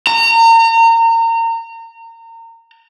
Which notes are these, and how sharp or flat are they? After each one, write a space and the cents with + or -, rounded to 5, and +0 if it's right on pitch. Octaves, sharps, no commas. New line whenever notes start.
A#5 -30